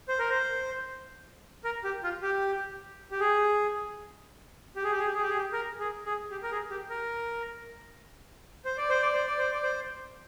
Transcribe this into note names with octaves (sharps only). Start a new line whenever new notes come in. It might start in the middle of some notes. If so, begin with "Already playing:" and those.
C5
A#4
C5
A#4
G4
F4
G4
G4
G#4
G4
G#4
G4
G#4
G4
G#4
G4
G#4
G4
A#4
G#4
G#4
G4
A#4
G#4
G4
A#4
C5
D5
C5
D5
C5
D5
C5
D5
C5